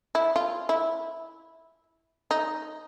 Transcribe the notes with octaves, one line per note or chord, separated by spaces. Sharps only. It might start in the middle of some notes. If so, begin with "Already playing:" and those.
E4
F4
E4
D#4